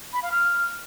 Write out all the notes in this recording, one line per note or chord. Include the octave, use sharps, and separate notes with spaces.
B5
F5
F6